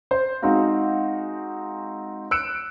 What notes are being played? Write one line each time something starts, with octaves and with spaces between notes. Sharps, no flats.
C5
G#3 C4 D#4 F#4 F5
E6 F#6 C#7 D7 E7